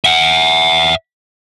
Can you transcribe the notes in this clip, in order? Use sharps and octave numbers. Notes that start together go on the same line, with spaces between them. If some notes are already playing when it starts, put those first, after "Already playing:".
E5 F#5